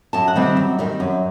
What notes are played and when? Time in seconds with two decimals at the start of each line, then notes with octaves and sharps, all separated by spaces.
0.13 F#2 A5
0.28 F#5
0.36 D#3 G3 C4
0.42 E5
0.57 F#2
0.78 D#3 G3 C4
1.00 F#2